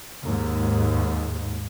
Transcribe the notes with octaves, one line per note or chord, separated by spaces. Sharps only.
D#2 G#2